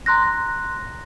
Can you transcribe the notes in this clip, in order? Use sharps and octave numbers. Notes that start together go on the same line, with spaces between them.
A#5 C6 F#6 A#6